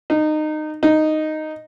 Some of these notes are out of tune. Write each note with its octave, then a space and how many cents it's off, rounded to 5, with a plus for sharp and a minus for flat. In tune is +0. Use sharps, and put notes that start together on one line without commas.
D#4 -20
D#4 -5